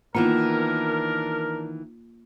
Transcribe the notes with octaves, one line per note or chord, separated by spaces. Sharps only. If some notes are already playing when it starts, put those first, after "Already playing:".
D#3 E3 A#3 B3 D4 F4 A#4